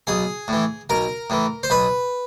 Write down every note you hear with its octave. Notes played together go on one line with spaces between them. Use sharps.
B1 G#4
A2 E3
B1 A#4
A2 E3
C5
B1 B4